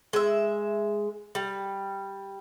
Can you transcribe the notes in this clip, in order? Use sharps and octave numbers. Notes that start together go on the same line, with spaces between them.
G#3 E5
G3